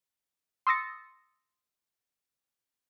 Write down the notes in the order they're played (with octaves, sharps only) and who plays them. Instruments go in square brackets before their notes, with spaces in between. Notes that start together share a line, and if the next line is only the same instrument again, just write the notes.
[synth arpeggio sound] C6 D#6 E6 A6 A#6 C#7